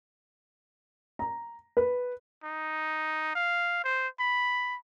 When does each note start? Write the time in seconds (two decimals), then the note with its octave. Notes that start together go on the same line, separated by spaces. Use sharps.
1.19 A#5
1.77 B4
2.43 D#4
3.35 F5
3.84 C5
4.19 B5